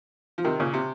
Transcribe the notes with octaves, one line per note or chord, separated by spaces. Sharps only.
F3
C3 D#3
A#2 C#3
C3